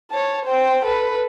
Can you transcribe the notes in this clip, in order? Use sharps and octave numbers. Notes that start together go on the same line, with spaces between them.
C#5 A5
C5 G5
A4 B4